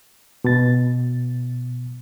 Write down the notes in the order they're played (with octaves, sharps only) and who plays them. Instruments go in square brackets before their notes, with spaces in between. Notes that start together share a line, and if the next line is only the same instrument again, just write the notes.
[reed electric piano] B2 A6